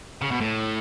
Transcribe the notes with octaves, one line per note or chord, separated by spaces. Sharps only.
C#3
B2
A2